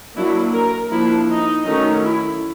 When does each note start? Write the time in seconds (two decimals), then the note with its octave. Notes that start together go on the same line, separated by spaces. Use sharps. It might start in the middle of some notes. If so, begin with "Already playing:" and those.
0.16 F#3 A#3 D4 E4
0.53 A#4
0.91 F3 A#3 D4 E4
1.28 D#4
1.65 D#3 F#3 A3 C#4 D#4
2.04 E4